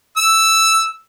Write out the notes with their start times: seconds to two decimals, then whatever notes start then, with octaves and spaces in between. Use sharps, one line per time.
0.17 E6